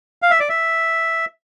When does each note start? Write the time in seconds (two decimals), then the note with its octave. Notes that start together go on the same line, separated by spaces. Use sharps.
0.22 F5
0.31 E5
0.40 D5
0.49 E5